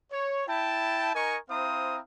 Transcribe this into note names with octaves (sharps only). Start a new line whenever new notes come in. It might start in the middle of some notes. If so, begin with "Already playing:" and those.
C#5
E4 G5 A5
D#4 A#4 D#5 G#5 C#6
C4 E4 C5 F5 A#5 D#6